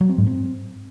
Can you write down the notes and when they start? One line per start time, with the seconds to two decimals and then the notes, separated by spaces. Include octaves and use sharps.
0.01 F#3
0.09 C4
0.18 G#2
0.27 C4